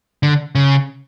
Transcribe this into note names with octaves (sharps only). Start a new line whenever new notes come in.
D3
C#3